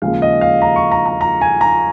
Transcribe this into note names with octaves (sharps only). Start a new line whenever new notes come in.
D#2 C#3 F3 G#3 F5
D#5
F5
A#5
C#6
A#5
A#5
A#5
G#5
A#5